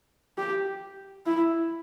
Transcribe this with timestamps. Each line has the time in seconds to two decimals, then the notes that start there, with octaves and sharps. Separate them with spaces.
0.38 G4
1.26 E4